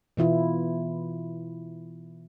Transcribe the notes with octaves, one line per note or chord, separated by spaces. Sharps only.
B2 E3 E4 F4